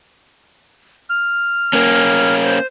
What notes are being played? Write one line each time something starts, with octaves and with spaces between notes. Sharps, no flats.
F6
A#3 C#4
C5